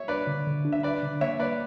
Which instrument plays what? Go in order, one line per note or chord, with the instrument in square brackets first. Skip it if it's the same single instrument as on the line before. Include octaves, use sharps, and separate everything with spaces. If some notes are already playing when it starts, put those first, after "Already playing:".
Already playing: [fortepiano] C#5 E5
[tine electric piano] D4 [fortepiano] B4 D5
[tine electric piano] D3
D3
D4
[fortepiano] E5
[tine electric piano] D4 [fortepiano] B4 D5
[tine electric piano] D3
[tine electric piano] A#3 [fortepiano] C#5 E5
[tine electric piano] A#3 [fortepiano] B4 D5